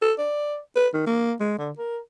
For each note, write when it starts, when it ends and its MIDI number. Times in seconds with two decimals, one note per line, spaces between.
0.02 0.13 69
0.19 0.57 74
0.76 0.88 71
0.94 1.05 51
1.06 1.33 58
1.40 1.54 56
1.58 1.71 50
1.78 1.99 70